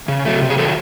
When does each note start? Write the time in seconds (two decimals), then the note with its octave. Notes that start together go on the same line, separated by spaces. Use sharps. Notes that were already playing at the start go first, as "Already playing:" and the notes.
0.08 C#3
0.25 F#3 A3
0.42 C3
0.50 G#4
0.58 D#3 F#3 A4